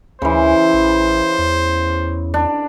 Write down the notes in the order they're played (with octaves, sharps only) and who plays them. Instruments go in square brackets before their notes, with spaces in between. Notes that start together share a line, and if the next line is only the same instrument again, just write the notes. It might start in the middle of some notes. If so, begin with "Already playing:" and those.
[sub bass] D2 [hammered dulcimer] C#3 E3 [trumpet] C5
[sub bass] A1
E2
[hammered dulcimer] D4